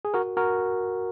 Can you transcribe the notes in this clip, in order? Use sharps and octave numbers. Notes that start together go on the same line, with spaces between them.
G#4
F#4 A#4
F#4 A#4